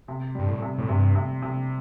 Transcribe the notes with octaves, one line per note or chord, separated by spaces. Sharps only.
C3
G2 G3
A2
C3
A2
G2 C3
C3
C3